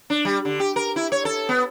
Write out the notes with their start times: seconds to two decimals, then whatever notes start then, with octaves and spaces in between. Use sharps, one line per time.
0.10 D4
0.25 G3
0.45 D3
0.60 G4
0.76 A#4
0.96 E4
1.12 C#5
1.25 A4
1.49 B3